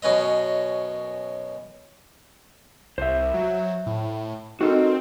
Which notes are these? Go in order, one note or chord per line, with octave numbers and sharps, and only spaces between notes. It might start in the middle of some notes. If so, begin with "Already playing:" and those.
F#2 B2 C#4 B4 D#5
C2 C5 E5
F#3
A2
C4 D#4 F#4 A4 A#4